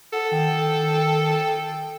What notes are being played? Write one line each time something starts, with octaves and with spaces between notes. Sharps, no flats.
A4 F#5
D#3 G5